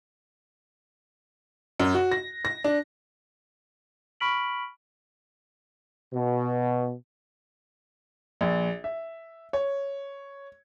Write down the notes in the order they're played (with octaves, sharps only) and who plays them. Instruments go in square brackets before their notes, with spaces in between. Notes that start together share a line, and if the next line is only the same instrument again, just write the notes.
[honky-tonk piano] F#2
F#4
A#6
A#6
D4
[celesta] B5 C#6 F6 B6 D7 F#7
[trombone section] B2
[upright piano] A#1
E5
C#5